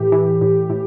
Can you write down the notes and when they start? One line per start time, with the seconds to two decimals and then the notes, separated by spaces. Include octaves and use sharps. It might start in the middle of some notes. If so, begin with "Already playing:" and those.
Already playing: A2 E3 G4
0.12 E3
0.41 A2
0.70 A2